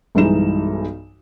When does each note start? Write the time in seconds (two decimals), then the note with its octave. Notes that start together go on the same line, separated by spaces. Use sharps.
0.15 B1 G2 E3 G#3 D#4 E7